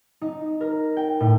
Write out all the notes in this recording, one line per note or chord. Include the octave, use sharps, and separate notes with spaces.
D#4
A#4
G5
A2